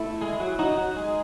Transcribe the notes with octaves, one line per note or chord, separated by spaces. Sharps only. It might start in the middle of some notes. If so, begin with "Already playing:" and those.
Already playing: A3 E4 A4
G#3 G#4
F#3 F#4
F#3 D#4 F#4
F#3 F#4
G#3 G#4